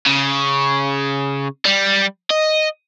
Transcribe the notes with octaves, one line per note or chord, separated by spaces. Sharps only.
C#3
G3
D#5